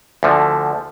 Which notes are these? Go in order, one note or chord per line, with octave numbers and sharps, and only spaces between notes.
D2 D3 F3 A3